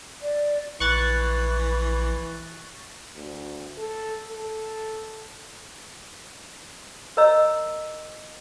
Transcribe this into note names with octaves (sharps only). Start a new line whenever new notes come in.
D5
A#1 E3 C#6 F#6 A6
D2
A4
A4
A#4 C#5 D#5 A#5 E6